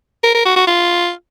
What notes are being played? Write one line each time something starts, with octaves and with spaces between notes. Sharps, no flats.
A#4
A#4
F#4
F#4
F4